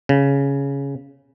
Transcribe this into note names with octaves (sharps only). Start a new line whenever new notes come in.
C#3